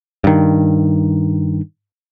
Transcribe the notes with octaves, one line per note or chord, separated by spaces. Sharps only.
G2 D#3